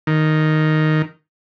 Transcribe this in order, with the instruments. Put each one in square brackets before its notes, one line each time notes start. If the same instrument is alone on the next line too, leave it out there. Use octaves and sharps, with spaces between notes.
[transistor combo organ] D#3